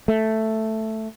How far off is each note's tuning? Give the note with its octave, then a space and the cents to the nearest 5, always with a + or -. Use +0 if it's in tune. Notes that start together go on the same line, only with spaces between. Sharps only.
A3 +0